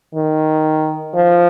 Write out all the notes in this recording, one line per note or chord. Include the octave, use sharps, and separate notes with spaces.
D#3
F3